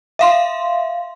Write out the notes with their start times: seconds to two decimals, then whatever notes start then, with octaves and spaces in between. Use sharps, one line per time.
0.19 E5 F5 C6